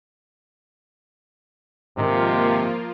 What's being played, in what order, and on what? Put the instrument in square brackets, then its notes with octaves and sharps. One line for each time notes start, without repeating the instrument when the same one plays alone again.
[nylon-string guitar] G#2 D#3 [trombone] C3 [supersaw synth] F3 A#3 F4